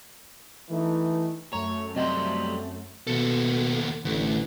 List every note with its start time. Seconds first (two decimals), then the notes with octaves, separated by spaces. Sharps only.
0.69 E3 A3 D#4
1.53 F#2 A3 C#5 A#5
1.96 F#3 G3 C4 C5 D#5 G5
3.07 D#2 B2 A4
4.05 A1 D3 A3